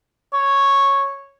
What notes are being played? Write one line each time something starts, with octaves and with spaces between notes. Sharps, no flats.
C#5